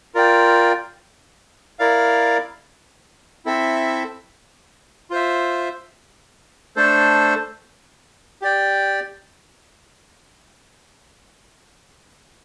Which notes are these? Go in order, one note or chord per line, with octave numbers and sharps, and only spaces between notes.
F4 A#4 D5 G5
E4 A#4 D5 F5
C4 E4 A4 E5
F4 C5 E5
A3 D4 A4 C5
G4 D5 G5